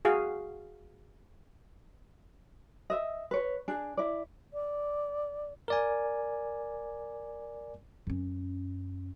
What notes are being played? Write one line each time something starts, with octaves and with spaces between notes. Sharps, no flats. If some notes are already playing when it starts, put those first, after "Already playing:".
F#4 G#4 F5
D#5 E5
B4 C#5
D4 G#4
E4 D5
D5
A#4 D5 G#5
F#2 C#4